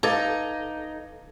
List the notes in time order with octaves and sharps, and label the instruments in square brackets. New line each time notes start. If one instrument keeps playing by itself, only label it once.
[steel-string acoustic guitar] D#4 [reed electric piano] A4 [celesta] B4 F5 [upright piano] D6 G#6 A6